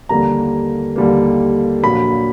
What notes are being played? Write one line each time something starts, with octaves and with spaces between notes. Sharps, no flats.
D#2 D3 G3 A#3 A#5
D#2 D3 G3 A#3
A#1 A#2 F#3 A#3 B5